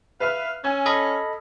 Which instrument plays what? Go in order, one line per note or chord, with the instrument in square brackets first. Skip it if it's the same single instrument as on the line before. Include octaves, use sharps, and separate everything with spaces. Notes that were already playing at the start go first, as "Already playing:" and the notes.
[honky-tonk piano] B4 E5 F6 [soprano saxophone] F5
[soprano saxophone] C#4 [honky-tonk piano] G#5 E6 G#6
[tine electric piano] A4 D#5 B5 [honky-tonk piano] F6